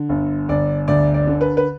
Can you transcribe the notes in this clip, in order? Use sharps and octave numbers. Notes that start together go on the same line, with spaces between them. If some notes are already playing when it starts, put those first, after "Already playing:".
Already playing: D3
G1
G1 D5
D2 D5
D5
D3
B4
B4